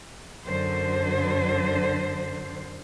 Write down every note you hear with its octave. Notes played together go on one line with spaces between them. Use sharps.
F#2 D3 C5